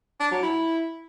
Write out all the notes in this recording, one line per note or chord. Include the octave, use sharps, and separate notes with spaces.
D4
F#3
E4